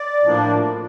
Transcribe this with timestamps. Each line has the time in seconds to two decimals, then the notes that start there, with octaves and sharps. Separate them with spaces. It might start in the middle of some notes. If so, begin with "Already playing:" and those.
Already playing: D5
0.24 A2 F3 A#3 D4